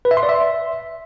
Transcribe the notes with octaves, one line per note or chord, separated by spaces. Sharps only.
B4
E5
C6
D5
E5